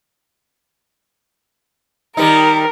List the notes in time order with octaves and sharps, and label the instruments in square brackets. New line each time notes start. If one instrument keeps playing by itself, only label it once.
[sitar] D#3 G3 D#4 [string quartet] A#4